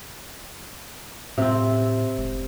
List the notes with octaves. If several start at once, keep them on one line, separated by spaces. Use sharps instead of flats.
A2 C3 C4
F1